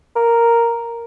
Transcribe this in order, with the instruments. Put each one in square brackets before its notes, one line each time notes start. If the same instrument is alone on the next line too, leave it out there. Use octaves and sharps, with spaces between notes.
[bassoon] A#4